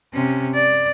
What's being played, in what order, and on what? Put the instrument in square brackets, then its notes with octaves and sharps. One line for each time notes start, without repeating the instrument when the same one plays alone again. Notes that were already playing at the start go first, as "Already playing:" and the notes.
[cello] C3 C#4
D5